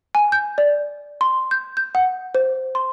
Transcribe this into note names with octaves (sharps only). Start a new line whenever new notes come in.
G#5
G6
D5
C6
G6
G6
F#5
C5
C6